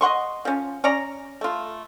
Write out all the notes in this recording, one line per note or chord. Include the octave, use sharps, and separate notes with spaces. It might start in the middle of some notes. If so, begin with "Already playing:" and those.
D#5 F#5 C6 C#6
F3 C#4
C#4 C#5 D5 A#5
A3 F4